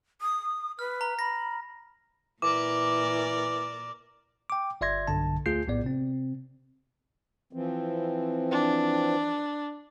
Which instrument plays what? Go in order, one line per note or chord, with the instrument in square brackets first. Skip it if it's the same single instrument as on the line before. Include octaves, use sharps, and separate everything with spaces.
[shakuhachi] D#6
[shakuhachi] B4 [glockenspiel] F6
[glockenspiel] A#5
[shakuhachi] B5 [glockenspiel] A#6
[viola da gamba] A#2 A#4 D5 [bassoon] E3 [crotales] D6
[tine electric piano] G5 D6
G1 D5 E5 C6 G#6 A#6
B1 G2 D3 A5
D2 A3 F4 G#4 G6 C7
A#1 A2 B3 D5
C3 C4
[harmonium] E3 F3 C4
[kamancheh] D4